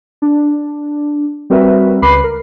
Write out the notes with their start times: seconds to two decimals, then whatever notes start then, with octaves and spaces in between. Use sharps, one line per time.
0.22 D4
1.50 G3 C4 F#4 A#4 B4 E5
2.02 C#2 B4 B5 D6 C7
2.24 A#4